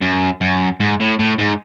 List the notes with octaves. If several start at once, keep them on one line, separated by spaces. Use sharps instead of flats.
F#2
F#2
G#2
A2
A2
G#2